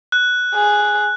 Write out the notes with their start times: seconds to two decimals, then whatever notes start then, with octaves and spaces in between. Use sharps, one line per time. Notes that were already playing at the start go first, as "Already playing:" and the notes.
0.12 F#6
0.54 G#4